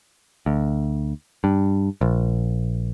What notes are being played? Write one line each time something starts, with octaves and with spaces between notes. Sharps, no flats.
D2
G2
A#1